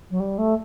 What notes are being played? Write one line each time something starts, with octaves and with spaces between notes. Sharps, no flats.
F#3
G3
A3